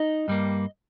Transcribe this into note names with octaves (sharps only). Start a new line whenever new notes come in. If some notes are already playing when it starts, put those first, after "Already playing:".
Already playing: D#4 D#5
G2 G3 A#3